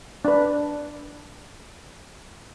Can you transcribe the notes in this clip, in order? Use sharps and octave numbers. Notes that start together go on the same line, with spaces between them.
D4 B4